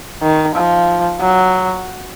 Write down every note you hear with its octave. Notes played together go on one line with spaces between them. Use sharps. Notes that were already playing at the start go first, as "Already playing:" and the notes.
D#3
F3
F#3